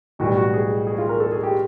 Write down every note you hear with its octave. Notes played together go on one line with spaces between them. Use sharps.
B1 A2 E3 G3 F#4
F#4
G#4
G#4
F4
A#4
A4
G#4
G4